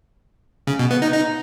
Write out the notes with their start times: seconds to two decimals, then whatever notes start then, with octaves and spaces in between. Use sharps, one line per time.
0.67 C#3
0.79 B2
0.91 B3
1.02 D#4
1.14 D#4